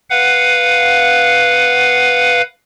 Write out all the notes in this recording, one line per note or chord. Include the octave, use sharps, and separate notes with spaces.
B4 F5 F#5